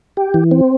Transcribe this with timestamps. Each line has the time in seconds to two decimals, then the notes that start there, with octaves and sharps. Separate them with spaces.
0.17 G4
0.34 E3
0.51 C4